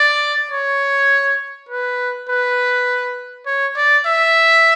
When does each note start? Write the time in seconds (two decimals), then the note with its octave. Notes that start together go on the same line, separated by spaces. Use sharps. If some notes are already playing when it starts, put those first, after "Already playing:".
Already playing: D5
0.51 C#5
1.69 B4
2.29 B4
3.47 C#5
3.77 D5
4.06 E5